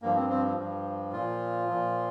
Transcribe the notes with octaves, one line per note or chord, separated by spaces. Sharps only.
G2 F3 A#3
C4
C4
G2 F3
A#2 F3 F4
A#2 F3